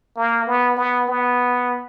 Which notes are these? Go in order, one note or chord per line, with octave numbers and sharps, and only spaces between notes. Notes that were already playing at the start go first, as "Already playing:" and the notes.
A#3
B3
B3
B3